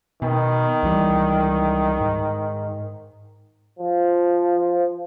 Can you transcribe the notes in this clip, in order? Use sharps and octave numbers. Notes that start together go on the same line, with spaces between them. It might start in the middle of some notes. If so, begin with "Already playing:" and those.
B2 D#3
C#2 E3 G3
G#2
F3